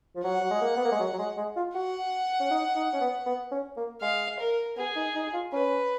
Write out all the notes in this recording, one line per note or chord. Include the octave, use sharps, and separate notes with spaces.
F3
F#3 F#5
F#3
G#3
A#3
B3
A#3
G#3
F#3
F#3
G#3
G#3
F4
F#4 F#5
C#4
D#4
D#4
C#4
B3
B3
C#4
A#3
G#3 F5
A#4
B3 G#4
D#4
D#4
F4
C#4 B4